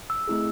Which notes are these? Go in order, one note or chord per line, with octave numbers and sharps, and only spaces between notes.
E6
A3 C4 E4 G#4